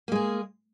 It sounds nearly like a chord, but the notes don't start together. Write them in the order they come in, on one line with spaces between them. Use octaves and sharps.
A#3 G#3 G#4